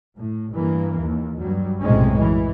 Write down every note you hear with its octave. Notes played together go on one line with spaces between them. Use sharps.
A2
G2 E3 A#3
D#2
G2 F#3 G3
B1 F#2 A2 C3 G#3 C#4
E3